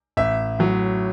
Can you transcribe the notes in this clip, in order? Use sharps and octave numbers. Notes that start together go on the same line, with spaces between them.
A1 E5
A2 F#3